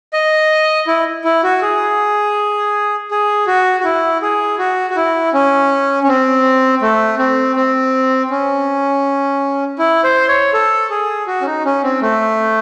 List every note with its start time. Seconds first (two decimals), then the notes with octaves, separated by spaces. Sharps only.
0.13 D#5
0.87 E4
1.24 E4
1.43 F#4
1.62 G#4
3.11 G#4
3.47 F#4
3.80 F#4
3.84 E4
4.22 G#4
4.59 F#4
4.90 F#4
4.96 E4
5.33 C#4
6.03 C#4
6.08 C4
6.82 A3
7.19 C4
7.56 C4
8.30 C#4
9.79 E4
10.04 C5
10.28 C#5
10.53 A4
10.90 G#4
11.27 F#4
11.41 C#4
11.46 D#4
11.65 C#4
11.83 C4
12.02 A3